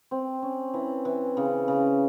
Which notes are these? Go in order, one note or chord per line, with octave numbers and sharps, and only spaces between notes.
C4
C#4
E3
E3
C#3
C#3